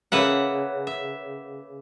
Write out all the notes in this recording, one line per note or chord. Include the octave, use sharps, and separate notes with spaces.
C#3 A#3 B4 E5 F#5
E5